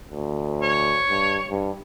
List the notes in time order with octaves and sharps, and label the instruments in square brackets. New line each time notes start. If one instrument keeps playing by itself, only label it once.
[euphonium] D2
[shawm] C#5
[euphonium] G2
G2